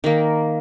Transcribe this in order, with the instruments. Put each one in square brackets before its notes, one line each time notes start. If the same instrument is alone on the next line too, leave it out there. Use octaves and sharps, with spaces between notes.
[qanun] D#3 A#3